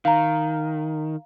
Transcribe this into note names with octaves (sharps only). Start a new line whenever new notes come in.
D#3 F5 A#5